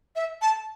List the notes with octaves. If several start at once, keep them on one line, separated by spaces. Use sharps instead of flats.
E5
A5